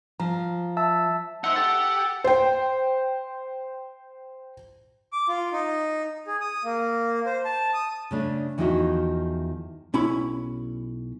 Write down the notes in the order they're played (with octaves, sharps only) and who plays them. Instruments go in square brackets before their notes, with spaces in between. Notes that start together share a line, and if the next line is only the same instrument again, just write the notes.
[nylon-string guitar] F3 [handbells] A#5
[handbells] E5 A5 E6
[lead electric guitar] D#4 C5 [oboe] E5 [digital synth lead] F#5
[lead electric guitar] G4 [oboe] A4
[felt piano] C5 G5
[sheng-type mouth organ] D6
F4
D#4
G#4
D#6
A#3
C5
A5
D#6
[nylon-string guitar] C#3 A3 D4
E2 D#3 F3 D#4 E4 F#4
[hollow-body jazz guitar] B1 C#4 E4 B5